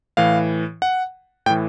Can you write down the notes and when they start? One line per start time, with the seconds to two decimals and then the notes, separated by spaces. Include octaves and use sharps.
0.17 A2 E3 F5
0.82 F#5
1.46 A2 G5
1.50 E3